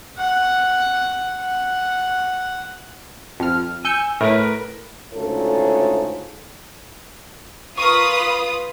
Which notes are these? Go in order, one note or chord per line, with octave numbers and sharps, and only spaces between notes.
F#5
F#5
F2 F6
G#5 E6 G6 C#7
A2 A#4 B4
D2 G#2 C#3 F4 A4 C#5
F4 A#4 B4 C#6 D#6